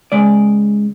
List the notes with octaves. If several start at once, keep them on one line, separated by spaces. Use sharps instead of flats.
C#3 G#3 D5